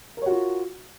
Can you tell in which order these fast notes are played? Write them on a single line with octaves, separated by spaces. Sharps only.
A#4 C#5 F#4 F4